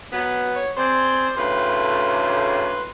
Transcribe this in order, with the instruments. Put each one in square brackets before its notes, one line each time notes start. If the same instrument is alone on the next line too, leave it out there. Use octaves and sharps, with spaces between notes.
[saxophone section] F#3 B3
[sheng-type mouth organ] C#5
[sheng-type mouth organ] C4 G#4 D5 [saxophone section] C5
[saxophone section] D2 A2 C#3 [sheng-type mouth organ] B4 C6